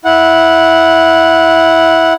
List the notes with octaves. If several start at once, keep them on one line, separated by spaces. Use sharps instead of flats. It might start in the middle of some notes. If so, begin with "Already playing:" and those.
E4 F#5